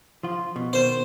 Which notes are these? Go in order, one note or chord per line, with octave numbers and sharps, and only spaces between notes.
F3 F4
B2
B2 D#3 C5